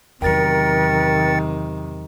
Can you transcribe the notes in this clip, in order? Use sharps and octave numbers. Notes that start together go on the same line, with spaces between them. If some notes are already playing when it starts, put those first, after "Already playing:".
E2 C3 D#3 F#3 A#4 G5 A6 C#7